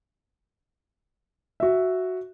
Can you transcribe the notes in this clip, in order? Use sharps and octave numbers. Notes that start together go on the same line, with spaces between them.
F#4 E5